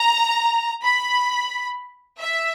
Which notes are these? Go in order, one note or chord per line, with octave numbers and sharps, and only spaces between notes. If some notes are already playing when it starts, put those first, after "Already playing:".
Already playing: A#5
B5
E5